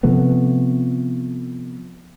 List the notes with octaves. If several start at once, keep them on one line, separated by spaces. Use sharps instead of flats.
C3 F3 A3 B3